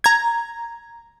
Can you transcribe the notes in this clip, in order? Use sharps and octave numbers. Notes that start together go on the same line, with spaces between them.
A#5 G#6